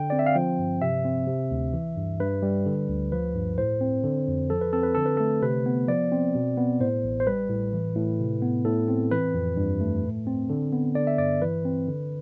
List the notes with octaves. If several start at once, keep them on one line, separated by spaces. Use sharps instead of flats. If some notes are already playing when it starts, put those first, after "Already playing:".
Already playing: D3 G5
C4 D5
E5
F5
F3 G5
G2
C3 E5
C4
C3
D2
E3
G2
G2 B4
G3
D3
D2
F3 B4
G2
A2 C5
C4
D3
F2
F3 A4
B4
C4 A4
B4
D3 A4
B4
A3 A4
C3 B4
B3
F3 D5
C4
B2
B3
A2 C5
A1
C5
G3 B4
A2
E3
A2
C3
B3
A2 A4
C4
E3 B4
F2
G2
A3
A2
C4
D3
B3
D3 D5
E5
G2 D5
E3 B4
C4
D3